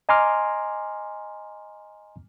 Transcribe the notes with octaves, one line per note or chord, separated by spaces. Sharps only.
D#5 G#5 A#5 C6 D6 F6